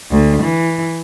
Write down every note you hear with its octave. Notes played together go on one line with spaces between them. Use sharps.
D2
E3